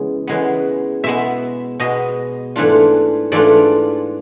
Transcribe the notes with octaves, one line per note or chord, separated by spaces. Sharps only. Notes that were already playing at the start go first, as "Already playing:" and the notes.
Already playing: C#3 E3 G#3 B3
C#3 E3 G#3 B3
B2 G#3 B3 E5
B2 G#3 B3 D#5
G#2 E3 A3 D4 F4
G#2 E3 A3 D4 F4 D5